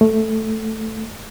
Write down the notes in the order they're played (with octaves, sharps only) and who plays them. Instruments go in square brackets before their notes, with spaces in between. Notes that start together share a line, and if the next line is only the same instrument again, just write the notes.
[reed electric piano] A3